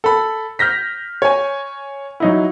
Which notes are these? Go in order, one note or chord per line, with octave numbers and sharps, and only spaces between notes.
A4 B5
F6 G6 A#6 B6
C#5 G#5
F#3 D#4 E4